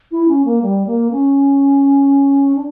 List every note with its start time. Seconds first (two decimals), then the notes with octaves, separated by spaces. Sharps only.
0.12 E4
0.28 C#4
0.45 A#3
0.62 G3
0.87 A#3
1.12 C#4
2.56 D4